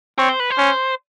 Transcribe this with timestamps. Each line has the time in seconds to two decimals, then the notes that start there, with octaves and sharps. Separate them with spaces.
0.19 C4 C#5
0.29 C5
0.40 B4
0.50 C5
0.58 C#4